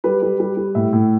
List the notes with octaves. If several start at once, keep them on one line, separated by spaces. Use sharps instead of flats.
G3 B4
G3
G3
G3
A2 E5
A2